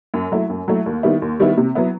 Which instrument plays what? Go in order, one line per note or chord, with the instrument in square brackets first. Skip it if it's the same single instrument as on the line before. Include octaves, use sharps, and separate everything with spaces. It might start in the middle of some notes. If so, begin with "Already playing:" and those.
[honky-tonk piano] F#2
F#3 A3 E4
F#2
F#3 A3 E4
D#2
D#3 G3 B3 E4
D#2
D#3 G3 B3 E4
C3
F#3 B3 E4